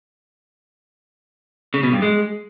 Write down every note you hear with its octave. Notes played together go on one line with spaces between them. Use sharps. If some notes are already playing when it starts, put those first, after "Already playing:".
C#3
B2
G2
G#3